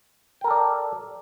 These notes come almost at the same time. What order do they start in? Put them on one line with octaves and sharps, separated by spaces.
G5 A#4 A4 D5